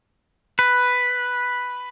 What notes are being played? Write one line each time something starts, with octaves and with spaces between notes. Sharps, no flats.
B4